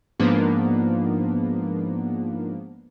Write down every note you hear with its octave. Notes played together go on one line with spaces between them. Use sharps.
G#2 F3 A#3 B3 D4